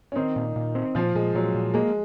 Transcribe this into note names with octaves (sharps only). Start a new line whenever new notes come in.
C#4
D#3 C4 D#4
A#2
A#2
C4
A#2 F3 F4
A#2 G#3
A#2 F#3
A#2
G#3 A#3